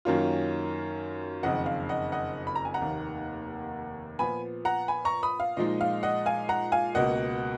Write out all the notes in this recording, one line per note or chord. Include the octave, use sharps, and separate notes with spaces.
F#2 D#3 A#3 C#4 F4
F#1 F2 D#3 D#5 F#5
F5
D#5 F#5
D#5 F#5
B5
A#5
G#5
F#5 A#5
F1 D#2 D#3 A#3
A#2 F3 B3 G#5 B5
F#5 A#5
G#5 B5
A#5 C#6
B5 D#6
F5
A#2 F3 G#3 D#4 D#5
F5
D#5 F#5
F5 G#5
F#5 A#5
F5 G#5
C#2 B2 A#3 D#5 F#5